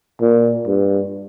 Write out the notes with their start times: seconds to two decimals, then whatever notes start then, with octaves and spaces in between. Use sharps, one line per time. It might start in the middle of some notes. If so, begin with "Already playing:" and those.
0.21 A#2
0.67 G2